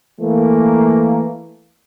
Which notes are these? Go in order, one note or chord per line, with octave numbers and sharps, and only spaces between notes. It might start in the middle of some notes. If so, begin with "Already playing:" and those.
E3 A3 A#3